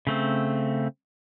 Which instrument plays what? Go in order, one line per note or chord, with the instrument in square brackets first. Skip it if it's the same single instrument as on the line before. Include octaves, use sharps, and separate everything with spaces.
[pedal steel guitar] C#3 A3 C4